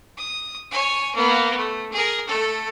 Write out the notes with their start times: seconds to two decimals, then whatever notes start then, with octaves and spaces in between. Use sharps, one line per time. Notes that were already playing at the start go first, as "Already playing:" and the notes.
0.17 D#6
0.71 C#5 G#5
1.15 A#3 B3
1.57 A3
1.92 G#4 A#4
2.27 A3 A4